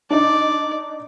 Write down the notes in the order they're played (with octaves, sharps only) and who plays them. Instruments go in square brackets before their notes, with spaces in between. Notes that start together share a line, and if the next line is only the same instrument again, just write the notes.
[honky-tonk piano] D4 D#4 [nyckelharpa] D5